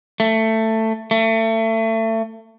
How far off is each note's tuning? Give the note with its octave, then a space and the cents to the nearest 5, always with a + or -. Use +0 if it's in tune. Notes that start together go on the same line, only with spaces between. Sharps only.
A3 +15
A3 +30